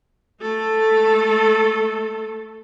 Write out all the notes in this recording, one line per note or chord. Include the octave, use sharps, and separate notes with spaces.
A3 A4